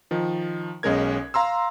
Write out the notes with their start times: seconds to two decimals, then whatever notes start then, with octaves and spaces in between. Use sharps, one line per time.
0.11 D#3 F3
0.83 B1 G#3 C#4 A#4 G#6
1.34 F5 A#5 C6 E6